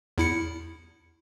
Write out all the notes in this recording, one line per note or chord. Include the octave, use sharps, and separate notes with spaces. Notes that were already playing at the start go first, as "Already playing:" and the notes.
E2 E4 C#7